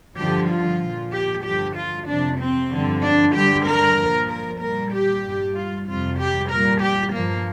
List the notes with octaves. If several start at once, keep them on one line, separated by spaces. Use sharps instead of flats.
G2 D3 F3 G4
F4
A#2 F3
G4
G2 D3 F3 G4
F4
F2 C3 F3 D4
C4
G2 D3 F3
D4
G2 D3 G3 G4
A#4
A#2 F3
A#4
A#2 G3 A#4
G4
G2 G3
F4
F2 C3 G3 F4
G4
A#2 G3 A#4
G4
G2 F3 A#3